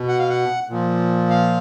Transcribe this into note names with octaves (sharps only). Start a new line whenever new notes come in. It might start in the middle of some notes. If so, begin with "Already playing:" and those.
Already playing: B2
F#5
F5
F#5
A#2 F3
F5